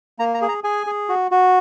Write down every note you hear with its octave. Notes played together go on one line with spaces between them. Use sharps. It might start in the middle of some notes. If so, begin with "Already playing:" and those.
A#3 A#5
A#5
G#4
A#5
G#4 G#5
G#4
F#4
F#4